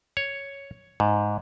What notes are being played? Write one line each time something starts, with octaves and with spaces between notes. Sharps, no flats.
C#5
G#2